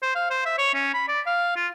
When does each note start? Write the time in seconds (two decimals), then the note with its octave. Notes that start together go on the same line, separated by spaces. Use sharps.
0.02 C5
0.15 F5
0.30 C5
0.45 E5
0.58 C#5
0.74 C#4
0.94 B5
1.08 D5
1.26 F5
1.56 F4